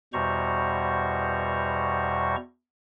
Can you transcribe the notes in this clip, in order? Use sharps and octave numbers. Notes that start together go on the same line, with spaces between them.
E2 B2 G3 C5 A#5 C#6